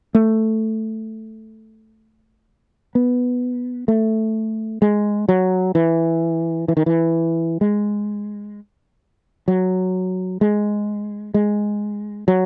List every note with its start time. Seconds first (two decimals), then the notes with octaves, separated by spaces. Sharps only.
0.15 A3
2.95 B3
3.88 A3
4.82 G#3
5.29 F#3
5.75 E3
6.68 E3
6.77 D#3
6.86 E3
7.61 G#3
9.48 F#3
10.41 G#3
11.34 G#3
12.28 F#3